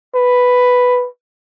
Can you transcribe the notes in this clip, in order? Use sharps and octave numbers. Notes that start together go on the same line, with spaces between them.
B4